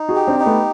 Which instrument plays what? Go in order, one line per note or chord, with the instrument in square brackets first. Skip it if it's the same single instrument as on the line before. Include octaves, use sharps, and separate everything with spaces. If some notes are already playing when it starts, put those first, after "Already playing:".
Already playing: [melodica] D#4
[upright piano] F#4 G#4
[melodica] G4
[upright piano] C4 D4
[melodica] D#4
[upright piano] A3 B3